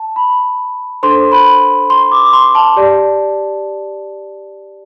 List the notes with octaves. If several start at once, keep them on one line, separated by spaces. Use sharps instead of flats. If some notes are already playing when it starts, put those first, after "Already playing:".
Already playing: A5
B5
D4 A4 C5 C6
B5
C6
D6
C6
A5
G4 D5